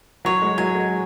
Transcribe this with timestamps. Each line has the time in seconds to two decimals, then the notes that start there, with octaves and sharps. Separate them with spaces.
0.25 F#3 C#5
0.42 G#3
0.58 F#3 G#5
0.75 G#3